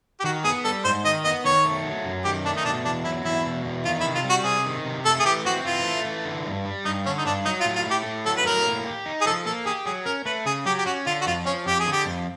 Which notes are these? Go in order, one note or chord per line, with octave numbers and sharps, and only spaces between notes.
G4
D#3 F#4
B3 G#4
G3 A4
G#2 C5
D#3 D#5
B3 D#5
D#3 C#5
A3
F#3
F#2
D#3 G4
A3 D4
D#4
B2 D4
E2 D4
F#3 E4
E2 E4
B2
E2
D#3 F4
E4
C3
F4
G3
F#4
C3 G#4
D#3
C3
A3 A4
G#4
E3 G4
C4 F#4
E3 F4
A3
E3
D3
G2
G3
G2 D#4
D3 C#4
D#4
G2 D4
F#3 D#4
F4
A2
F4
A3
G4
A2
F#3 A4
B4
A2 A#4
A#3
G4
D#4
G#4
F3 A4
A#3 A4
G4 G#4
F#3 G#4
C#4 A#4
A3 B4
C#3 G#4
F#3 G4
G4
C#4 F#4
D3 F4
F#4
F2 F4
F3 C#4
F2 G4
G#4
D3
G4
F2